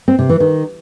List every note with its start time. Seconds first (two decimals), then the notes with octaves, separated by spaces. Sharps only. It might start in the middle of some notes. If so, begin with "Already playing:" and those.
0.08 C4
0.19 C3
0.29 E3
0.40 D#3